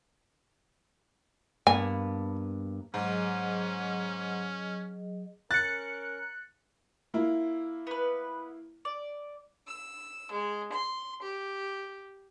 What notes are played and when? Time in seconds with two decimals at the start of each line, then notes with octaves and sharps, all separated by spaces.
1.67 G2 A#3 B3 G#5
2.94 G#2 F#3 C#4 G#4 D#5
5.51 C#4 A#4 F#6 A6 C#7
7.14 A#3 E4 F4
7.87 B3 B4
8.85 D5
9.68 E6
10.31 G#3
10.74 C6
11.22 G4